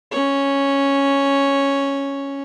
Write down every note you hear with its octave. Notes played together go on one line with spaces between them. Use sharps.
C#4 C#5